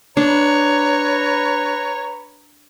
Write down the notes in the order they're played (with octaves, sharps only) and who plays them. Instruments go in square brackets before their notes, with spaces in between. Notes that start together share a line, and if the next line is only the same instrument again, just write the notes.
[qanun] D4 [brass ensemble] B4 A#5 [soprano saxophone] C#5